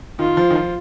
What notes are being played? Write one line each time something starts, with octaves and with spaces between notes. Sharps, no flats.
D#3 F4
F3
D#3
F3